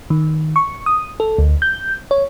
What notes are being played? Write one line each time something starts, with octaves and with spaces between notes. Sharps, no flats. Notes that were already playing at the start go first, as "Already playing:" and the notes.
D#3
C#6
D#6
A4
D2
G6
C#5